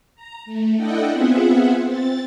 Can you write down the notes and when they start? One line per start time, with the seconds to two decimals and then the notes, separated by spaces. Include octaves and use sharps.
0.15 A#5
0.46 A3
0.76 D4 E4 A4 D#5 F#5 G5
1.12 B3 C4 F4 G#4 E5 F#5
1.84 C4 A6